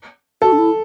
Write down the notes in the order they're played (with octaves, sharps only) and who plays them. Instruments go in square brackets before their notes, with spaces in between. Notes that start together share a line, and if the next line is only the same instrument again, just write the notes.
[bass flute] F#4 [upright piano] A4
[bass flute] D4
E4